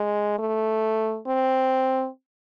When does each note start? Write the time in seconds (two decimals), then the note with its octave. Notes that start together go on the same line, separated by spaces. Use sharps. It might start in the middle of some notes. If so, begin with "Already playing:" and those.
Already playing: G#3
0.39 A3
1.27 C4